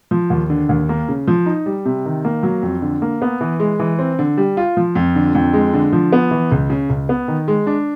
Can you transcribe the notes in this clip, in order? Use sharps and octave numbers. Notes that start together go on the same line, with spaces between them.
F3
D#2
D3
D#2
A#3
C#3
F3
D#4
G3
C3
D#3
A#3
F#3
F2
D3
A#3
B3
E3
G#3
E3
C4
D3
G3
F4
F3
F2
D3
F2
G#3
D3
F3
B3
E3
C#2
C#3
C#2
B3
D#3
G#3
D4